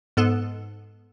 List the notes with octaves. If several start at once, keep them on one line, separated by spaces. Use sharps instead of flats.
G#2 B3 A4